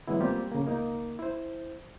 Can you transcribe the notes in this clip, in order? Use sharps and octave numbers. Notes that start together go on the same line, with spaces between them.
E3 F#3 G#3 B3 E4
G3 A#3 C4 F4 G4
C#3 A#3
C#2 A#3 D#4 A#4
E4 C5